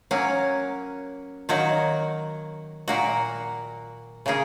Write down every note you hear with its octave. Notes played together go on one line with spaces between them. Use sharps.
F#3 A#3 C#4
D#3 F#3 A#3 F#4
A#2 A#3 F#4
C#3 A#3 C#4 G#4